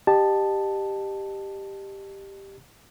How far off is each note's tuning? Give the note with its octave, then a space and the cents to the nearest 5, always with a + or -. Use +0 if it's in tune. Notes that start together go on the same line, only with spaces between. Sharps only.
G4 +0 D#5 -35 A5 +0